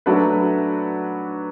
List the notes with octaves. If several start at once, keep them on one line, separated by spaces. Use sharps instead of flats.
F#3 A3 D4 F#4 B4